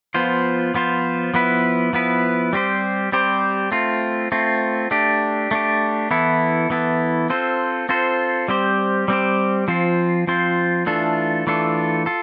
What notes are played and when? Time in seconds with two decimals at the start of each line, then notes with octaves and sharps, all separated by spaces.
0.14 F3 B3 F4 C5
0.74 F3 B3 F4 C5
1.34 F3 B3 E4 B4
1.93 F3 B3 E4 B4
2.53 G3 C4 G4 C5
3.12 G3 C4 G4 C5
3.72 A3 C4 F4
4.32 A3 C4 F4
4.91 A3 D4 G4
5.51 A3 D4 G4
6.11 E3 B3 E4 A4
6.70 E3 B3 E4 A4
7.30 C4 F4 A4 C5
7.89 C4 F4 A4 C5
8.48 G3 C4 G4 C5
9.08 G3 C4 G4 C5
9.68 F3 C4 F4 C5
10.27 F3 C4 F4 C5
10.86 E3 A3 D4 F4 A4
11.47 E3 A3 D4 F4 A4
12.06 F4 A4